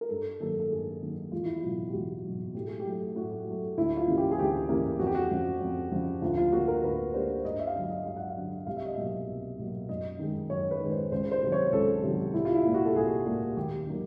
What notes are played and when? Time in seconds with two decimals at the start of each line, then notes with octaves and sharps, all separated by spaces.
0.01 A#4
0.09 G2 A4
0.40 D#3 F#3 A#3 A4
0.59 A4
0.71 G2 G#4
1.02 D#3 F#3 A#3
1.32 E2 F4
1.45 E4
1.57 F4
1.62 B2 F#3
1.88 G4
1.93 E2 F#4
2.24 B2 F#3
2.54 A2 G4
2.67 G#4
2.80 G4
2.86 F#3 A3
3.16 A2 F#4
3.47 F#3 A3
3.78 D2 E4
3.97 F4
4.07 C#3 E3 G3 A#3
4.17 G4
4.31 G#4
4.38 D2 G4
4.69 C#3 E3 G3 A#3
4.99 F2 F#4
5.07 G4
5.15 F#4
5.31 C#3 F3
5.61 F2
5.92 C#3 F3
6.22 D2 F4
6.38 F4
6.52 D3 G3 A#3 F#4
6.68 A#4
6.83 D2 B4
7.14 D3 G3 A#3 C5
7.44 G2 D#5
7.59 E5
7.67 F5
7.74 D3 F#3 E5
7.90 D#5
8.06 G2 F5
8.16 F#5
8.27 F5
8.36 D3 F#3
8.66 C2 F5
8.77 E5
8.86 D#5
8.95 B2 F#3 A#3 E5
9.28 C2
9.59 B2 F#3 A#3
9.89 F#2 D#5
10.19 D#3 G#3
10.50 F#2 C#5
10.71 B4
10.81 D#3 G#3
10.91 C5
11.11 C#2 C5
11.31 C5
11.43 C3 D#3 F#3
11.52 C#5
11.72 C#2 A4
12.03 C3 D#3 F#3
12.34 C2 E4
12.45 F4
12.54 E4
12.64 A#2 G3 A#3
12.74 F#4
12.86 A4
12.95 C2 G#4
13.25 A#2 G3 A#3
13.57 D#2 G4
13.87 D#3 F#3 A#3